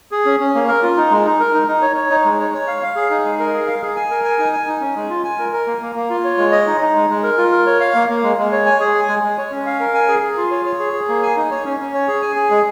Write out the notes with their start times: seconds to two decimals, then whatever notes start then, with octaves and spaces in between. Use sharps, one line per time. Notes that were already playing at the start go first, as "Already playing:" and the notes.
0.11 G#4
0.25 C#4
0.40 C#4
0.55 A#3
0.68 A#4
0.83 F4
0.97 D#4
1.11 G#3
1.25 D#4
1.40 A#4
1.53 D#4
1.68 D#4
1.82 C#5
1.96 C#5
2.10 D#4
2.25 G#3
2.40 C#5
2.54 C#5
2.67 F5
2.83 F5
2.96 G#4
3.10 D#4
3.25 G#3
3.39 A#4
3.53 G#4
3.67 F5
3.81 G#4
3.96 G#5
4.11 A#4
4.24 G#5
4.39 D#4
4.52 G#5
4.67 D#4
4.81 C#4
4.96 G#3
5.09 F4
5.24 G#5
5.39 A#4
5.53 A#4
5.67 A#3
5.81 A#3
5.95 A#3
6.10 F4
6.24 C#5
6.38 G#3
6.52 D#5
6.67 D#4
6.81 D#4
6.95 G#3
7.10 G#3
7.23 A#4
7.38 F4
7.52 A#4
7.66 C#5
7.80 F5
7.95 A#3
8.09 A#3
8.23 G#3
8.37 G#3
8.52 C#5
8.66 G#5
8.80 G#4
8.94 G#5
9.08 G#3
9.23 G#3
9.38 C#5
9.52 C#4
9.66 F5
9.80 A#4
9.94 G#5
10.08 G#4
10.22 G#4
10.37 F4
10.51 C#5
10.65 C#5
10.79 G#4
10.93 G#4
11.08 A#3
11.23 G#5
11.36 D#4
11.51 C#5
11.65 C#4
11.80 C#4
11.94 C#5
12.08 G#4
12.22 G#5
12.36 G#4
12.50 G#3